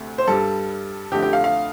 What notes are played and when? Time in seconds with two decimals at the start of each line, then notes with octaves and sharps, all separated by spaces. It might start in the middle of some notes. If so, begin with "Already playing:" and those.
Already playing: D2 C3 A3
0.18 C5
0.27 G2 G3 A4
1.12 F2 D3 A3 G4
1.22 G4
1.33 F5
1.44 F5